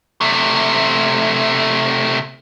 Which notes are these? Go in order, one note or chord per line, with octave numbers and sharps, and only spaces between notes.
C3 A3